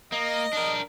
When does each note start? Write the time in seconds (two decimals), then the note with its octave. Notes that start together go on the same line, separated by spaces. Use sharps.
0.12 A#3 D#5
0.53 D4 A#4